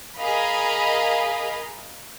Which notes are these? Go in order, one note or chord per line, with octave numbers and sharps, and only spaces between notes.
G#4 A#4 D#5 F5 B5